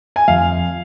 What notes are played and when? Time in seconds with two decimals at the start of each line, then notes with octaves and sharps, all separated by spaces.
0.16 G#5
0.28 F2 F5